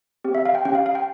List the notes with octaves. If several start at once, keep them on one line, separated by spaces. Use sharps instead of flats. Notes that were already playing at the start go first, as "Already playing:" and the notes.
C4 G4
E5
F5
G5
C#4 G4 G5
F5
F5
G5